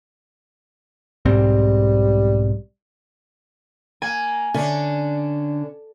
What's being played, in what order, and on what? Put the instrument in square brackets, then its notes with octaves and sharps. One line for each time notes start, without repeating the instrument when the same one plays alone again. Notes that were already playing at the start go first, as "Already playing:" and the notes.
[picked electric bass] B1 G#2 C4 [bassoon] G3
[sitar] A#3 [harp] G#5
[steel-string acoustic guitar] D3 [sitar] C#4 D4